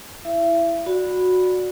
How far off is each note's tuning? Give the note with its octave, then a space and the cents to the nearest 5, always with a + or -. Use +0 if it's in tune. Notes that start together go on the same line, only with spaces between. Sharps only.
E4 +0 E5 +35
F#4 -15 D5 +0 B5 +0